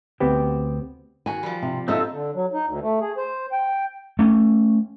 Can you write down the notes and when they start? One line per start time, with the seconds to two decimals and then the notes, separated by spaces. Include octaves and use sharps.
0.20 D2 B3 C4 G4
1.26 D#3 F#4 G#5
1.43 F3 G3
1.62 C3
1.88 C4 D#4 F4 G4 A4 D#5 E5
2.12 D3
2.34 F#3
2.53 D#4
2.66 D2
2.81 A3
3.00 G#4
3.18 C5
3.52 G5
4.19 A3 C#4